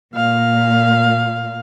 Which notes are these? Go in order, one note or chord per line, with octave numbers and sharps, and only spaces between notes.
A#2 F5